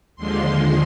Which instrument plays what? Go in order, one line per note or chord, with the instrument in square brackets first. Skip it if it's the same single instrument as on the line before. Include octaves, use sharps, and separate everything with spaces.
[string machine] D#2 D3 F3 G#3 C6